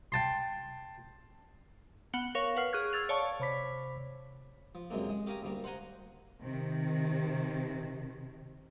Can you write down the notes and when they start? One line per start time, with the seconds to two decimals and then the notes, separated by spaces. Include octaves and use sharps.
0.12 G5 A5 C6
2.13 B3 F#5 C#7 F#7 G7
2.35 A#4 C#5 F5 C#6
2.57 B4 F#5 F6 C7
2.73 G#4 C#6 F6 F#6 G#6
2.93 E6 G#6 A6 F7
3.09 C#5 D5 F5 A5 C#6
3.40 C3 C5 C#5 B5 D6 B6
4.75 F3
4.90 B1 F#2 C3 G#3 A#3
5.09 G#3
5.26 C#4 G4 A#4 F5 G#5 A#5
5.42 D2 G3 A#3
5.64 C5 F5 F#5 G#5 A#5 C6
6.41 C3 D#3